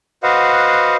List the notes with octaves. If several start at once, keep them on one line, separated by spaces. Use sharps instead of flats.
F#4 B4 C5 D#5 F5 F#5